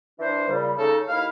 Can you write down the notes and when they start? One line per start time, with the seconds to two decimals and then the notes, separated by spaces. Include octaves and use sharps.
0.20 E3 D4 C5
0.49 A#2 C#3 G3
0.78 C#3 D#4 A4
1.08 D#2 E4 F5